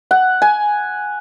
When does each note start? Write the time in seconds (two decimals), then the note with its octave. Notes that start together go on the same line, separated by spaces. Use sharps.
0.11 F#5
0.42 G#5